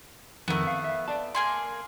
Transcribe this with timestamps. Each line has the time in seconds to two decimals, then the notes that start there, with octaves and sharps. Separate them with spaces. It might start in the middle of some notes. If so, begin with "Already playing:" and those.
0.48 F2 D#3 A3 B3 A#4
0.67 F5
0.84 E5
1.08 D5 A5
1.35 A#3 G#4 C6